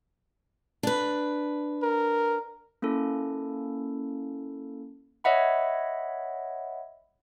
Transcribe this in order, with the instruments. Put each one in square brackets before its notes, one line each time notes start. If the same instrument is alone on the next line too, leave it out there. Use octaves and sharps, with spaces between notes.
[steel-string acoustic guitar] D4 B4
[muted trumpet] A#4
[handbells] A#3 C#4 E4 A4
C#5 D#5 E5 F#5 B5